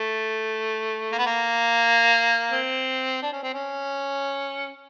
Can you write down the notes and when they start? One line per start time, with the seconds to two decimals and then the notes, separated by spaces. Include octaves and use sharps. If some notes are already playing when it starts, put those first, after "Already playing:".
Already playing: A3
1.12 A#3
1.18 B3
1.26 A#3
2.52 C4
3.22 D4
3.33 C#4
3.43 C4
3.53 C#4